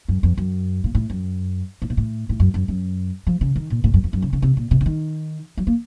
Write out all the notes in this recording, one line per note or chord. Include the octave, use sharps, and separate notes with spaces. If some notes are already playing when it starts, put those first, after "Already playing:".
F#2
F2
F#2
A#2
A2
F#2
A2
A#2
A2
A2
F#2
F#2
F#2
F3
C#3
D#3
A#2
A2
F#2
F2
F#2
C#3
C#3
C3
A#2
C3
C#3
D#3
F#3
A#3